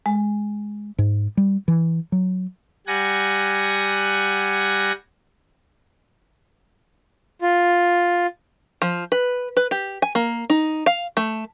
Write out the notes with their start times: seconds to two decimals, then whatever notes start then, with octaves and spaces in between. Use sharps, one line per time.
0.06 G#3
0.98 G#2
1.37 G3
1.68 E3
2.12 F#3
2.87 G3 F#5 G#5 A#6
7.42 F4
8.82 F3
9.12 B4
9.57 B4
9.71 G4
10.02 G#5
10.15 A#3
10.50 D#4
10.86 F5
11.17 A3